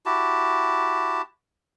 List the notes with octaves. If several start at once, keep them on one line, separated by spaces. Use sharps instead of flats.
E4 F#4 G4 A5